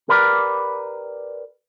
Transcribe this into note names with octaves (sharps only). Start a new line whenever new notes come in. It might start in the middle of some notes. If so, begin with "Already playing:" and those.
G4 A#4 B4 D5